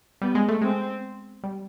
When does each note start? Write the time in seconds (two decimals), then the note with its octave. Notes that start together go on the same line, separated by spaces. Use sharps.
0.22 G3 B3
0.35 G#3
0.48 A3
0.61 G#3 C4
1.44 G3